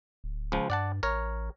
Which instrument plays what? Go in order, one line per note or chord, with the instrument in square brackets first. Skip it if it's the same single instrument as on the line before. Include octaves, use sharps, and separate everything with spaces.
[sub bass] D1
[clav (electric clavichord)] C#2 F3
[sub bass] G2 [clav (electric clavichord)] D5 F#5 A5
[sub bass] A1 [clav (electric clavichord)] A#4 C#5